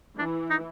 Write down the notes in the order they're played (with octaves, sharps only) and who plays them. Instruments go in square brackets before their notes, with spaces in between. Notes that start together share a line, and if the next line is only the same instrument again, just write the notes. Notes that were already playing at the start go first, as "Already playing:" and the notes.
[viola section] E3 [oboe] D4
[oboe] D#4